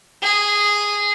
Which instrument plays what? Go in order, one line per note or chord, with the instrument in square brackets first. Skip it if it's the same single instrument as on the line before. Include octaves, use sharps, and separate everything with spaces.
[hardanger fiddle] G#4